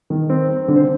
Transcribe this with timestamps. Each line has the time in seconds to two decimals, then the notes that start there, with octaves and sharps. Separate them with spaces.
0.10 D#3
0.30 C4
0.49 C4
0.68 D3
0.76 C5